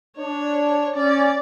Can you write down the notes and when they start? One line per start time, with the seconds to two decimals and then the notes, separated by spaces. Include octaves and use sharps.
0.18 D4 C#5
0.96 C#4 D5